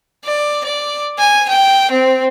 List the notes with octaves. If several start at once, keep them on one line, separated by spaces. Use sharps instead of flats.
D5
D5
G#5
G5
C4